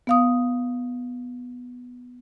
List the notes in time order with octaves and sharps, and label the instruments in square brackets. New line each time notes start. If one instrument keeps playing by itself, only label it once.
[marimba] B3 F5 D#6